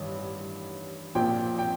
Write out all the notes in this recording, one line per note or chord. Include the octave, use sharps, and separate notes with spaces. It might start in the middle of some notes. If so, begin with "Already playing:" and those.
Already playing: A1 G2 D#3
A#1 A#2 F3 G5
G5